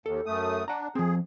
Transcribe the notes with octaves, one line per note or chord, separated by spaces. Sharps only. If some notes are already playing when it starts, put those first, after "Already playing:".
D#2 A4
F#2 A3 D#6
D4 F#5 A#5
F3 C4 G#4